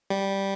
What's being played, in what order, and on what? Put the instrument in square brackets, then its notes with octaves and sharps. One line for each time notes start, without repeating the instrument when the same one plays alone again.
[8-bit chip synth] G3